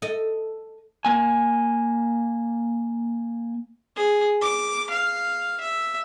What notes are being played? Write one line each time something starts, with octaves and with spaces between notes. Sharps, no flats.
A4 D#5
A#3 G#5
G#4
D6
F5
E5